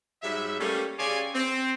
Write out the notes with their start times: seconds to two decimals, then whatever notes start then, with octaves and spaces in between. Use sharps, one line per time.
0.23 G#2 F#3 G3 E5
0.60 G3 A3 A#3 C#4
0.98 C#3 C#4 G4 D5 G#5 C6
1.35 C4